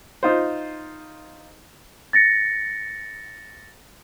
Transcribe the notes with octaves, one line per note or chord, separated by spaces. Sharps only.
D#4 F4 C5
A6 A#6 C#7